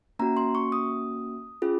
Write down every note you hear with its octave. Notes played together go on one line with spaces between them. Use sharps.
A#3 C#4 F#4 A#5
C6
C#6
D#6
C#4 F4 G#4